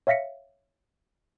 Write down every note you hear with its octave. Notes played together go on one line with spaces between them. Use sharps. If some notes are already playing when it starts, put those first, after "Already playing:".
C#5 E5 F5 A#6 B6 C#7